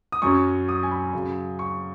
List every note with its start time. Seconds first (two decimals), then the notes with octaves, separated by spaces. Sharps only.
0.12 D#6
0.22 F#2 F#3 C#4 C#6
0.69 D#6
0.83 G#5
0.91 B5
1.13 F#2 C#3 F#3
1.59 C#6